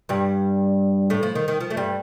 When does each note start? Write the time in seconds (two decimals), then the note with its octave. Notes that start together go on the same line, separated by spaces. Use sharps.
0.09 G2 G3
1.10 A2 A3
1.23 F3
1.35 D#3
1.48 D#3
1.61 F3
1.71 A3
1.77 G2 G3